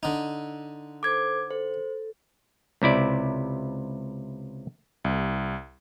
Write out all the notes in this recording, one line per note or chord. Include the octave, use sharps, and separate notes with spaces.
D3 D#4
A4 C5 D6 G#6
A4 C5
C#2 C3 E4 D5
C2